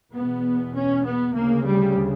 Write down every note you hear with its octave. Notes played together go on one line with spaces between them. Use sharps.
E2 B2 B3
C#4
B3
D2 C#3 A#3
G3